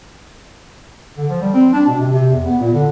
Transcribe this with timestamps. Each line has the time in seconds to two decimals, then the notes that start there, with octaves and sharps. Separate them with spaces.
1.17 D3
1.30 F3
1.41 G3
1.54 C4
1.73 D4
1.87 B2
2.00 C3
2.13 C3
2.30 E2
2.45 B3
2.60 A#2
2.73 D3